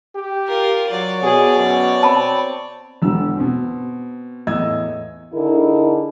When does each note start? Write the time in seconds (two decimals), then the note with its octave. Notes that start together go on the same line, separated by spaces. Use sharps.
0.15 G4
0.48 F4 A#4
0.91 F#3 C#5 D5
1.23 B2 G#4
1.56 F#2
2.03 C4 A5 B5
3.02 E1 D3 E6
3.37 B2 C4
4.47 E2 A2 D#5 E6 G#6
5.31 D3 D#4 E4 G#4 A#4